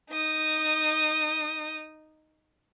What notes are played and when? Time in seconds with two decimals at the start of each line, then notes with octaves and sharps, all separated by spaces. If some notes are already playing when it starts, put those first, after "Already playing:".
0.10 D#4 D#6